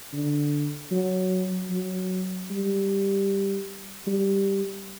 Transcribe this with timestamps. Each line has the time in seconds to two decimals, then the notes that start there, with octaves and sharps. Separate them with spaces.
0.13 D3
0.92 F#3
1.71 F#3
2.51 G3
4.07 G3